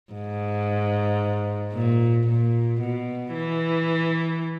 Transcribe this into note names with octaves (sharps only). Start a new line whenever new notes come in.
G#2
A#2
A#2
B2
E3